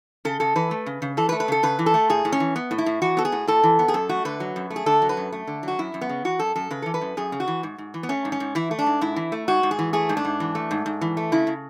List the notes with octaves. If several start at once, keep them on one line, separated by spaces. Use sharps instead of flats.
C#3 A4
C#3 A4
E3 B4
A3
C#3
C#3
E3 A4
B4
A3
B4
C#3 A4
C#3 B4
E3
A4
A3
A2 G#4
A2
C#4
E3
B3
A2
E4
A2
E3 F#4
B3 A4
G#4
A2
A2 A4
E3
B3
G#4
F#2 A4
A3 F#4
D3 B4
F#3
F#2
A3
G#4
D3 A4
F#3
B4
F#2
A3
D3
F#3 F#4
F#2 E4
F#2
B3
C#3
E3 F#4
F#2 A4
F#2 A4
C#3 B4
E3 A4
B4
F#2
F#2 G#4
C#3
F#4
E3
G#2
G#2
E3
B3
A3 C#4
G#2
C#4
G#2
E3 E4
A3
D4
G#2
G#2 E4
E3
A3
G#2 F#4
G#2
G#4
E3
A3 G#4
G#2
D4
G#2
E3
A3
G#2
G#2
E3
A3
C#3 E4
C#3